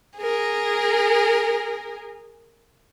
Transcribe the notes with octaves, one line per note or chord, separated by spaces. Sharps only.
G#4 A#4